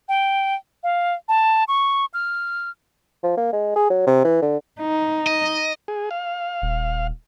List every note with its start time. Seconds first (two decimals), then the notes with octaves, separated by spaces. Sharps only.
0.09 G5
0.83 F5
1.29 A5
1.68 C#6
2.14 F6
3.23 F3
3.37 A#3
3.53 G#3
3.76 G#4
3.90 F#3
4.07 C3
4.24 E3
4.42 D3
4.81 D#4
5.27 D#5
5.88 G#4
6.11 F5
6.62 D#1